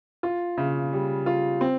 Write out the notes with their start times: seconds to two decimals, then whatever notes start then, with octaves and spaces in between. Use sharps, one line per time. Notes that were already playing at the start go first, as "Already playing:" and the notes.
0.23 F4
0.58 C#3
0.93 G3
1.26 F4
1.61 C4